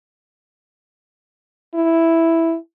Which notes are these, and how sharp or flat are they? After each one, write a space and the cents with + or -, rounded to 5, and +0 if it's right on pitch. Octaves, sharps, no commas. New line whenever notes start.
E4 +0